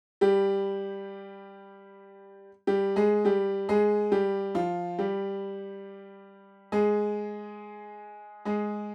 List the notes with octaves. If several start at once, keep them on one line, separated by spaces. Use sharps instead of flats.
G3 G4
G3 G4
G#3 G#4
G3 G4
G#3 G#4
G3 G4
F3 F4
G3 G4
G#3 G#4
G#3 G#4